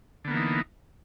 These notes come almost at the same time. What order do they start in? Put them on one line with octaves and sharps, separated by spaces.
D3 B3 A#3 E3 D#4